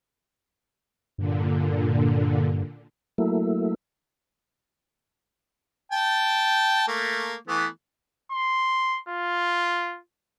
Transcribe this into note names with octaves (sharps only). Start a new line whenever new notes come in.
G2 A#2 D3
F#3 A3 A#3 E4
G5 A5
A3 A#3
E3 A3 B3
C6
F4